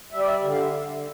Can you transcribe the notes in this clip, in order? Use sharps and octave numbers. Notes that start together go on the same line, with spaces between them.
G3 E5
D5
E5
D3
F5
E5
D3